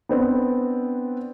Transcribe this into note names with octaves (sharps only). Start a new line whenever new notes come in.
B3 C4 D4